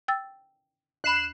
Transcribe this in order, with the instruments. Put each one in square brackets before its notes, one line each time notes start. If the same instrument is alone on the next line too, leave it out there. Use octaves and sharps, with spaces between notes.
[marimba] G5 E6 A6
[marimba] D#2 B5 [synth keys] F#6 C7 E7